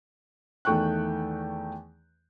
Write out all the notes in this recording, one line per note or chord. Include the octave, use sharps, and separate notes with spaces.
E2 D#3 A3 G5 C#6 F#6